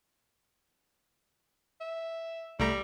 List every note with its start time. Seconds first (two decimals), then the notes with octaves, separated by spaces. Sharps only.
1.81 E5
2.60 C2 G3 A3 A#5